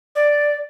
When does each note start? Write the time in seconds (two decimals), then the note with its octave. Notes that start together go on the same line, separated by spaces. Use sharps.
0.15 D5